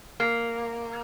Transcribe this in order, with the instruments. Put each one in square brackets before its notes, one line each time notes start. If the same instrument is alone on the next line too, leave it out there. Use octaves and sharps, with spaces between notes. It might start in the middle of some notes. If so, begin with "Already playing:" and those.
[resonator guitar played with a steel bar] A#3